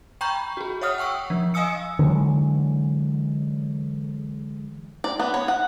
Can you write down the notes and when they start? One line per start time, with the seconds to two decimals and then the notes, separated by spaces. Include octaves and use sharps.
0.21 G5 A#5 B5 C#6 G6
0.57 F#4 G#4
0.81 C#5 E5 F#5 D#6 F6
0.98 F#5 G5 C#6 E6
1.30 F3
1.54 D#5 F5 G#5 D#6 E6 C#7
1.99 D3 E3 F#3 G#3
5.04 D5
5.19 B3
5.34 C#5
5.48 F#5